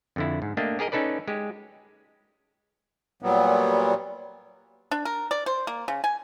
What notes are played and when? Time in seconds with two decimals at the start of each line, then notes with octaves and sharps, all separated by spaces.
0.16 F2 D3 E4
0.42 G#2
0.57 A3 A#3 D4 G4 D#5
0.79 G4 G#4 A#4 D#5
0.92 C#4 D#4 A4 B4 D5
1.28 G#3 G4
3.23 A#2 F#3 G3 B3
4.91 D4
5.05 A#4
5.31 D5
5.46 C5
5.67 A#3
5.88 C#3
6.04 G#5